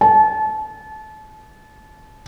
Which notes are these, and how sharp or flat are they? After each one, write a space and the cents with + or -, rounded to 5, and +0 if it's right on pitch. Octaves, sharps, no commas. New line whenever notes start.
A5 -30